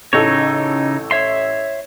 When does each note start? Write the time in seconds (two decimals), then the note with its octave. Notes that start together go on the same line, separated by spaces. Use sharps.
0.13 A1 C#3 D#4 A4 C#5
1.11 C#5 E5 C6